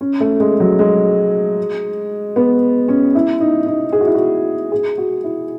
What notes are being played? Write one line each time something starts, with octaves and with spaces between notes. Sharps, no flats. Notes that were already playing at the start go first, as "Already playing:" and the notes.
C#4
A3
G#3
F#3
G#3
B3
C#4
E4
D#4
D#4
G#4
F#4
E4
F#4
G#4
F#4
E4